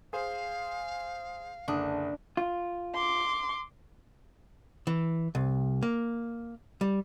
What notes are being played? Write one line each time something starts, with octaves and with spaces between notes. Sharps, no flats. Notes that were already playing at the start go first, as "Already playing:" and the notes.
G#4 C5 F5
F#1 D3 D4 D#6
F4
C6 D6
E3
C2
A#3
G3